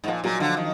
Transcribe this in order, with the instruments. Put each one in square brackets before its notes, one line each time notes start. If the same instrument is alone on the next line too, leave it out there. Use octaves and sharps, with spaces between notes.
[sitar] G#2
[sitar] A#2 [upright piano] F3
[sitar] A#2 [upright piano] F#3
[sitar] D3 [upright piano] F3
[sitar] D#3